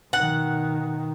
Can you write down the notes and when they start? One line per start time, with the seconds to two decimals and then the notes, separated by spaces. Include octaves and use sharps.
0.13 B2 D#3 F#5